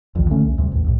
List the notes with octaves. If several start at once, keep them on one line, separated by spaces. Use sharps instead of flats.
A#1 D#2 D#3
D3 A3 C#4
C2
D2 C3 G3
A1 D#2
C2 A2